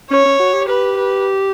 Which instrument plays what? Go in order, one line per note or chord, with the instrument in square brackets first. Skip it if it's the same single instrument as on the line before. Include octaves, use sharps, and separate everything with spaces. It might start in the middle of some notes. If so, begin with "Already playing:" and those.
[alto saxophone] C#4 [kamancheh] C#5
[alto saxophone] C#4
F#4
G4
[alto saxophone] G4 [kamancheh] B4
[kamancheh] B4